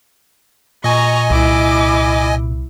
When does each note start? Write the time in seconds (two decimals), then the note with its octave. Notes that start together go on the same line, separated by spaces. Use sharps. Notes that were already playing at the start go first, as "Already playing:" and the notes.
0.84 A#2 D#5 G#5 A#5 C#6
1.30 C2 E4 D6